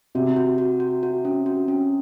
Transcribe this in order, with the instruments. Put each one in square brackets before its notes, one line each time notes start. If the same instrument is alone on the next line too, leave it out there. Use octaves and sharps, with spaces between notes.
[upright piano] C3 [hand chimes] F#4
[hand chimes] F#4
F#4
F#4
F#4
C#4
F#4
C#4